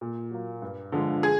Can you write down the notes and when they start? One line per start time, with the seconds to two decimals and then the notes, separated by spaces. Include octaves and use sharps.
0.01 A#2
0.31 F#3 A#3
0.62 G2
0.92 D3 F3 G#3
1.23 G#4